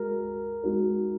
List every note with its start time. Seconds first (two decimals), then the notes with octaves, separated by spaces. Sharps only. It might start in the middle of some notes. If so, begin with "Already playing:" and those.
Already playing: G#3 F#4 A#4
0.64 G#3 D#4 F#4 A#4